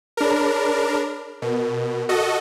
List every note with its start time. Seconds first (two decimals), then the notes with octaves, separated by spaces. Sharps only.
0.17 D4 G#4 A#4 C#5 B5
1.42 B2 A#4
2.09 F#4 A4 D#5